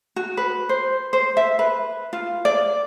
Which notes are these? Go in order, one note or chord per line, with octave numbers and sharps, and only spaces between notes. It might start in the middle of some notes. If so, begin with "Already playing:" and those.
F#4
B4
C5
C5
E5
B4
F4
D5